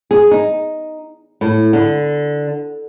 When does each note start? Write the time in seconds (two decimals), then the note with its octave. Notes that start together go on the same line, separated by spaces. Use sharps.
0.11 G#4
0.31 D#4
1.41 A2
1.73 D3